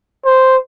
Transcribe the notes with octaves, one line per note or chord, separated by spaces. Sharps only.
C5